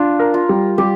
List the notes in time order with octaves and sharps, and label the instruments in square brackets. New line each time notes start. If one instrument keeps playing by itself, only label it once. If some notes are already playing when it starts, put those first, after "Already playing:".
Already playing: [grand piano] D4 [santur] F4
[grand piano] A#4
[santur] F4
[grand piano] G3
[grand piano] G3 [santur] G4